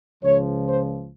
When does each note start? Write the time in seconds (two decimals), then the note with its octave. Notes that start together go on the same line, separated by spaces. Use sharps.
0.23 C#2 C#3 F3 C#5
0.67 C5